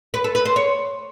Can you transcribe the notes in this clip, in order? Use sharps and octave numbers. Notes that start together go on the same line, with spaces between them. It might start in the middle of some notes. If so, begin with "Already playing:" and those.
B4
A4
B4
C5
C#5